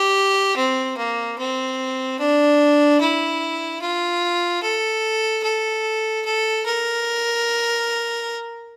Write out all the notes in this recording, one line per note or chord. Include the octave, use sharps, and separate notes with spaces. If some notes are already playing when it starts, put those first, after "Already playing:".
Already playing: G4
C4
A#3
C4
D4
E4
F4
A4
A4
A4
A#4